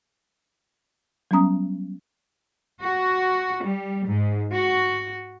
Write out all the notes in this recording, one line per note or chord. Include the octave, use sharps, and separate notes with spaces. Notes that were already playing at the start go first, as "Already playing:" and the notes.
F#3 G3 B3 C#4 A#5 D#6
F#4
G3
G#2
F#4